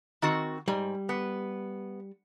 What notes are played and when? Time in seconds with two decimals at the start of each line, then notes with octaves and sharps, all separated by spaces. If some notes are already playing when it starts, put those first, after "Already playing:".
0.22 D#3 C4 F#4
0.68 G#2 G3
1.09 B3